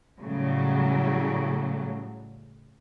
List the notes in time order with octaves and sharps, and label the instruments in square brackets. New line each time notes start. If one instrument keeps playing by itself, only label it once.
[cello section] A2 C#3 F#3 G3